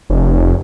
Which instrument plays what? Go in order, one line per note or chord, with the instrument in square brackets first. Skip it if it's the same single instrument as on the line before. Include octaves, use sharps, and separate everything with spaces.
[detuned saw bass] F1